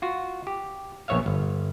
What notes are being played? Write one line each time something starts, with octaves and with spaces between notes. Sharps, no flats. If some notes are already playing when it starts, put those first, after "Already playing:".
F4 F#4
G4
A#1 B3 C#5 E5 F5
G1